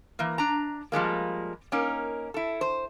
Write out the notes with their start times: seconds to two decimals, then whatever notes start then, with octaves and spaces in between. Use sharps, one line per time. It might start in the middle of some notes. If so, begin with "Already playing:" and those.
0.19 E3 A#3
0.38 D4 A#5
0.92 F3 G3 G#3 A#3
1.72 A#3 C#4 D#4 A#4
2.34 E4 A4
2.61 C5